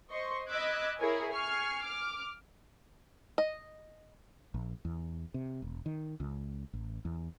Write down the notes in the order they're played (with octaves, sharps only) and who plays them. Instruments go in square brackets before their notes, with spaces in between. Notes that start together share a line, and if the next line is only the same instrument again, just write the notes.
[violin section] C5 D#5 C6 C#6
D#5 B5 D6 E6 F#6 G#6
E4 G#4 A#4 C#5 G#5
G#5 C#6 F6 C7
D6 F6
[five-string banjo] D#5
[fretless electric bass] A#1
E2
C3
E1
D#3
C#2
A1
E2